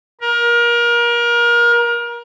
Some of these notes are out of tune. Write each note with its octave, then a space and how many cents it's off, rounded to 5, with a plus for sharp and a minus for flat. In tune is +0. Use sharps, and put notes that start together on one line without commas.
A#4 +30